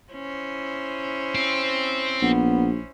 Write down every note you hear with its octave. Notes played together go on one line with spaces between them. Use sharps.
C#4 E4 C5
C4
A#1 B3